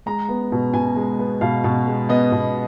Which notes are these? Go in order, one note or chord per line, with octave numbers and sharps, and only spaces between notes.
G#3 A#5
B3
B2
B2 G#5
G#3
B3
B2 F5
B2
G#3
B3 D#5
B2